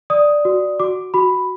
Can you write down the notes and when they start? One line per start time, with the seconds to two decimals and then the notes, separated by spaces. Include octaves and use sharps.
0.10 D5 D#6
0.45 F#4
0.80 F#4 D6
1.14 F#4 B5